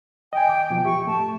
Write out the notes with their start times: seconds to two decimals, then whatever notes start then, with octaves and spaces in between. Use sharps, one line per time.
0.33 D#5 G5 G#5
0.49 D#2 D6
0.70 B2 F3
0.85 E2 G4 E5 C#6
1.07 A2 A3 A5